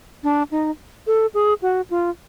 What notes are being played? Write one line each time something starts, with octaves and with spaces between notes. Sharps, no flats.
D4
D#4
A4
G#4
F#4
F4